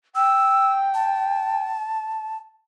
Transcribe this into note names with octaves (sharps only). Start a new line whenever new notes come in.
G5 E6
A5